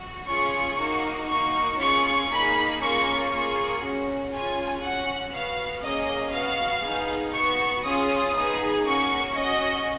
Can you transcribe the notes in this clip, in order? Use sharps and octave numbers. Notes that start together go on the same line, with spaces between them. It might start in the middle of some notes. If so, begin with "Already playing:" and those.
Already playing: F#4
C#4 F4 G#4 C#6
A#3 D#4 F#4
A#3 D#4 F#4 C#6
C#4 F4 G#4 C#6
A#3 D#4 G#4 B5
A#3 C#4 F4 G#4 C#6
A#3 F4 G#4 C#6
C#4 F#4
C#4 F4 G#4 G#5
C#4 F#4 F#5
B3 F#4 F5
A#3 C#4 G#4 D#5
B3 F#4 F5
B3 D#4 G#4
B3 F#4 C#6
C#4 F4 G#4 D#6
B3 D#4 G#4
A#3 C#4 F#4 C#6
C#4 F#4 D#5